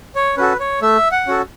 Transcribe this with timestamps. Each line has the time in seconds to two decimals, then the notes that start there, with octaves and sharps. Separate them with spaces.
0.15 C#5
0.37 C#4 F#4 A4 B4
0.60 C#5
0.82 A3 E5
1.11 F#5
1.27 C#4 F#4 A4